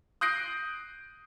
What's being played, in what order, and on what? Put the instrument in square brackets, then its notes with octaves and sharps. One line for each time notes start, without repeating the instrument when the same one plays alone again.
[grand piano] D#6 F#6 G6 A#6 C7 D7